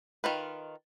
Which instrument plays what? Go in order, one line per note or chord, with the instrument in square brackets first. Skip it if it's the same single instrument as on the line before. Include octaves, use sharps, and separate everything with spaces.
[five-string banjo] D#3 F4 B4